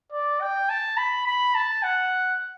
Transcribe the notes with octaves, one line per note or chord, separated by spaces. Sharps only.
D5
G5
A5
B5
B5
A5
F#5